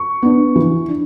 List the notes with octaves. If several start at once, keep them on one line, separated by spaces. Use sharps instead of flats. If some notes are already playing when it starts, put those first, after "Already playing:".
Already playing: C#6
B3 D4
E3
D4